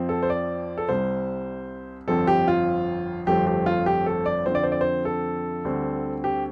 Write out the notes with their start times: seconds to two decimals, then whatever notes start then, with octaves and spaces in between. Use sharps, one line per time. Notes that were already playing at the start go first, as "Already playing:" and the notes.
Already playing: F2 F3 C4
0.09 A4
0.23 C5
0.30 D5
0.78 A4
0.89 C2 C3 G3 C5
2.08 G1 F2 F3 C4 A4
2.27 G4
2.48 F4
3.26 G1 F2 F3 A3 C4 G4
3.47 G4
3.66 F4
3.86 G4
4.06 A4
4.26 D5
4.46 F2 D3 F3 C4 C5
4.55 D5
4.63 C5
4.72 D5
4.81 C5
5.05 A4
5.65 D2 D3 G3 C4
6.24 G4